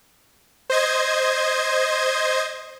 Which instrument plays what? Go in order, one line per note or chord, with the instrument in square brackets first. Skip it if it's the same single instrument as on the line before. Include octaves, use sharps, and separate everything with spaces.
[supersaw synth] C5 D#5 G#6